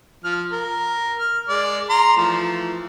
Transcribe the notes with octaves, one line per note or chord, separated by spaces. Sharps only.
F3 F6
A#4
F6
G#3 D5
A#5 C6
E3 F3 A3